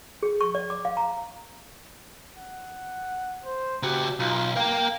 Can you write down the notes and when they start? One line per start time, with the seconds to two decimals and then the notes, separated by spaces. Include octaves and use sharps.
0.23 G#4
0.41 C#6
0.55 D5
0.70 D6
0.85 F5
0.97 A#5
2.36 F#5
3.44 C5
3.83 C#3 F#4 G4
4.20 B1 F4
4.56 A#4 F5 G5